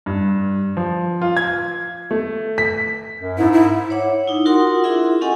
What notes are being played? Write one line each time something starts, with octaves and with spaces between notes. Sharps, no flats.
G2
F3
F4
G#6
A3
B6
F#2
G#2 E4
E4
C#5 E5 F#5 D6
D#4 E4
F4 F#4 A#4 F#5 C6 D#6
D4 E4 F4 G#4 E5
C#4 G4 A4 D#5 F#5 G#5